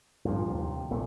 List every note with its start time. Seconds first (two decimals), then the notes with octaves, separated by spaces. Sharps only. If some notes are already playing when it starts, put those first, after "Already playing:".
0.25 G2 A#2 F3
0.48 D#2 C3
0.91 B1 A#2 A3